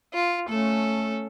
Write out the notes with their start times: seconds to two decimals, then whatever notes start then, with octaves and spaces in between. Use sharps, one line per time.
0.13 F4
0.49 A3 C#4 A4